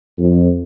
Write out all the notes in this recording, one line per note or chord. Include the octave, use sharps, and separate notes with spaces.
F2